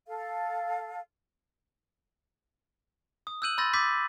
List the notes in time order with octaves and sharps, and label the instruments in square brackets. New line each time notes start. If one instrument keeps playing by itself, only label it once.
[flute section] A4 F5
[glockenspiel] D#6
E6 F#6 G6 D#7 F#7
B5 C6 E6 G6 A6 A#6
D6 E6 G6 A6 B6